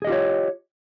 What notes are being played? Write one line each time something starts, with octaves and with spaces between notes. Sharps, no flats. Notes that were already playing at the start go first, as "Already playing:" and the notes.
F4 G4 G#4 C#5 D#5